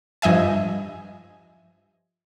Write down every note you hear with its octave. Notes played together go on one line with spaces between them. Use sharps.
G2 F3 D#5 E5 G#5